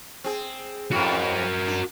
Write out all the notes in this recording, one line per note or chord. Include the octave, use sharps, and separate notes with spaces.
C4 G#4
F2 A2 F#4 A#4
D4